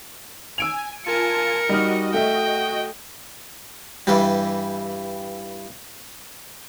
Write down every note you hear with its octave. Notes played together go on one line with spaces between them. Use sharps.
G#5 E6 D7 F7
F4 A#4 G#5 A5 C#7
G3 D#4 F#4 D#5 F6
A3 E5 G5
G2 E3 G3